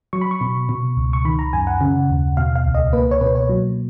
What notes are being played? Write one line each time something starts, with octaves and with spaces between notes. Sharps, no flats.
F#3 C#6
B5
C#6
B2
B2
C#2
C#6
D#3 B5
A#5
F#2 G#5
F#5
C#3
D#2
B2 F5
F5
C#2
D#5
A#3 B4
C#5
B2 B4
C#5
F#3